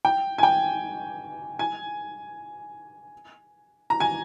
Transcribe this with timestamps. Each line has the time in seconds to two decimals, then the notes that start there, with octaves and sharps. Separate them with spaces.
0.05 G5
0.38 G#5
0.43 G5
1.59 G#5
3.90 A#5
4.00 G#5